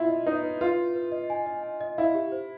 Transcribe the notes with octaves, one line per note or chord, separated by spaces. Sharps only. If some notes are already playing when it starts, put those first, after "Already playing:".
Already playing: E4 F4
D#5
D#4 B4
B4
F4 B4
B4
B4
D#5
G#5
D#5
G#5
D#5
E4 F5
G4
C5